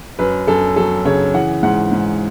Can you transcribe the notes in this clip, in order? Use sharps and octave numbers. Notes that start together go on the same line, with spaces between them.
F#2 B4
F#2 A4
F#3 A4
C#3 C#5
E3 F#5
G#2 F#5
G#2